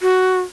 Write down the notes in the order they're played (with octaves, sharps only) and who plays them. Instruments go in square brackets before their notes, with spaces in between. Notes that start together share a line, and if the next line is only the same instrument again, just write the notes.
[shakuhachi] F#4